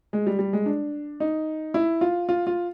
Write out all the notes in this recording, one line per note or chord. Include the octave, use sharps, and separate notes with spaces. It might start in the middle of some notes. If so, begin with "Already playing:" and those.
G#3
G3
G3
G#3
D4
D#4
E4
F4
F4
F4